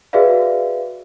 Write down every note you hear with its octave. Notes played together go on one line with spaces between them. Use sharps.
F#4 G#4 B4 D5 E5 F5